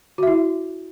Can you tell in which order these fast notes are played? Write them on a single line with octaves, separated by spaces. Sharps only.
F#4 E5 E4